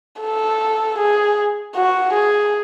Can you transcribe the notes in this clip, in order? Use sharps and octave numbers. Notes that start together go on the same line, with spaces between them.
A4
G#4
F#4
G#4